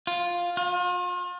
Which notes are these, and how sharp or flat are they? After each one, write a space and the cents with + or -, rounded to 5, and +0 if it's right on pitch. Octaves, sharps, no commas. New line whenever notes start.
F4 +5
F4 +40